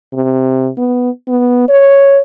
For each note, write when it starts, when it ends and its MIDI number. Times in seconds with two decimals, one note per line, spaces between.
0.13 0.69 48
0.77 1.10 59
1.28 1.67 59
1.69 2.20 73